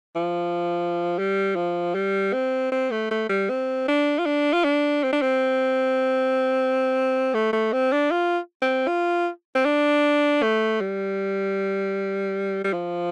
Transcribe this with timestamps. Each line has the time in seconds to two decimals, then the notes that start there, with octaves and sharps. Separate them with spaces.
0.16 F3
1.18 G3
1.56 F3
1.95 G3
2.33 C4
2.72 C4
2.91 A3
3.11 A3
3.29 G3
3.50 C4
3.88 D4
4.19 F4
4.26 D4
4.53 F4
4.64 D4
5.03 C4
5.13 D4
5.22 C4
7.34 A3
7.53 A3
7.73 C4
7.92 D4
8.11 F4
8.62 C4
8.88 F4
9.55 C4
9.65 D4
10.43 A3
10.81 G3
12.64 G3
12.73 F3